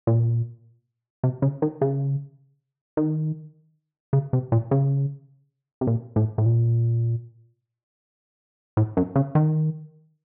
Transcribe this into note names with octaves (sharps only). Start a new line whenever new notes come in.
A#2
C3
C#3
D#3
C#3
D#3
C#3
C3
A#2
C#3
C3
A#2
A2
A2
A#2
A2
F#2
C#3
D#3